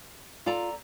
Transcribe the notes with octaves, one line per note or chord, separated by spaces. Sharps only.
F4 A4 D5 A#5